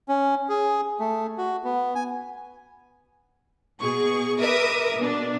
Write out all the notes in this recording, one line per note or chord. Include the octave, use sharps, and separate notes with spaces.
C#4
G#4
A3
F#4
B3
G#5
B2 G#4 C#6
A#4 B4 E5 D6 D#6
B2 D4